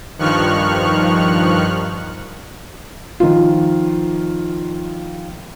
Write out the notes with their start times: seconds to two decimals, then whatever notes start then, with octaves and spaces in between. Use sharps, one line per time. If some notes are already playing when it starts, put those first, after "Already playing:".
0.19 G2 D#3 F3 C#6 F6 F#6
3.20 D#3 F3 F4